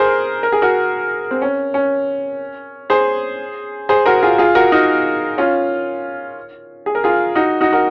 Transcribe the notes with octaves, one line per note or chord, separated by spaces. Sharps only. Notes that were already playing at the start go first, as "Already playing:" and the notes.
Already playing: G#4 A#4 C5
A#4
G#4
F#4 A#4
C4
C#4
C#4
G#4 C5
G#4 C5
F#4 A#4
F4 G#4
F4 G#4
F#4 A#4
D#4 F#4
C#4 F4
G#4
A#4
F4 G#4
D#4 F#4
D#4 F#4
F#4 A#4